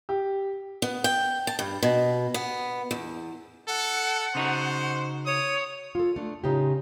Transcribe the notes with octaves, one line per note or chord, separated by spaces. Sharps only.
G4
B3
G5
A5
G2
B2
B3
E2
A4 F#5
C#3 D#4 F#4 C5
C#5 D#6
F4 A4
A3 D4
A2 C#3 D#4 F4 G4